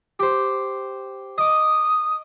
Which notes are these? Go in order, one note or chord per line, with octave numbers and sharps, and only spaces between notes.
G4 C5
D#5 D6 D#6